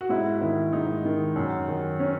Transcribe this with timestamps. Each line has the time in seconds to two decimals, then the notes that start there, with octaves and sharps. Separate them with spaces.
0.01 F#4
0.09 G#2 E4
0.41 D#3 E4
0.73 G#2 D#4
1.05 D#3
1.36 F#2
1.68 D#3
2.00 C#4